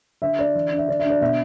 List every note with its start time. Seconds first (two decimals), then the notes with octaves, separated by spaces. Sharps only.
0.22 D3 E5
0.39 D4 D5
0.55 E3
0.71 D4
0.78 E5
0.89 D3 D5
0.99 E5
1.04 D4
1.10 D5
1.21 B2 E5